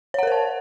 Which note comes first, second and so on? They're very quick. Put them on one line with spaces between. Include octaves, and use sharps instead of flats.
C#5 F#5 A#4 C5 A5